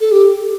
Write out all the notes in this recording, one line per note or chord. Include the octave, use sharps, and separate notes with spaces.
A4
G4